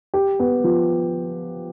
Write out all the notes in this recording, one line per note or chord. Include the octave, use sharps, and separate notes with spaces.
G4
B3
F3